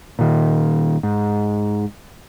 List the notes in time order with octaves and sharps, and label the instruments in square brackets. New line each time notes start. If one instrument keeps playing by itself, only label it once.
[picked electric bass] A#2 D#3
G#2